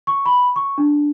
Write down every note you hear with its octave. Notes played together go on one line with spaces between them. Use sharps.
C#6
B5
C#6
D4